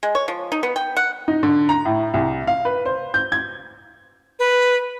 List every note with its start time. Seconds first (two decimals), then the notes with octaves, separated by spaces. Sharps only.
0.03 G#3
0.15 C#5
0.28 F3
0.52 D#4
0.63 B3
0.76 G5
0.97 F#5
1.28 D#4
1.43 D3
1.69 A#5
1.85 A2
2.14 C2
2.47 F5
2.65 B4
2.85 C5
3.14 G6
3.32 G#6
4.39 B4